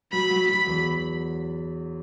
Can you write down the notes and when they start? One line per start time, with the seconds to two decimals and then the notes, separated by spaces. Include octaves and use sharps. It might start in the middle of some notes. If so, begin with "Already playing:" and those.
0.12 F#3 B5
0.30 F#3
0.48 F#3 B5
0.67 E2